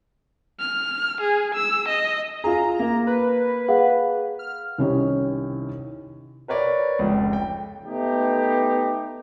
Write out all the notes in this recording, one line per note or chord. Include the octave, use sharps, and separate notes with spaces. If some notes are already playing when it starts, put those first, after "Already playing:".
F6
G#4
E6
D#5
F4 G#4 A#5
A#3
B4
G#4 F5 F#5
F6
C2 D#3 C#4 D#4 G4 C#5
A#4 B4 C#5 D5
F1 C#2
G5
A3 B3 D#4 G4